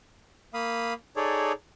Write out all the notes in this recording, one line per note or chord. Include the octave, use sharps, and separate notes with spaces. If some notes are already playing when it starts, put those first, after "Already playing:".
A#3 F5 B5 D#6
D#4 G#4 A4 C#5 D5